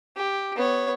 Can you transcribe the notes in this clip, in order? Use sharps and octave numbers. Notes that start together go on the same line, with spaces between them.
G4
B3 C#5